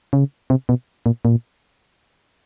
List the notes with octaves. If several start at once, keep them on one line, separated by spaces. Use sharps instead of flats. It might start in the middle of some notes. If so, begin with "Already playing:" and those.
C#3
C3
B2
A#2
A#2